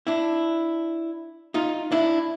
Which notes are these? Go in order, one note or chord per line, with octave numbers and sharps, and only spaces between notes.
D4 E4
D#4 F4
D4 E4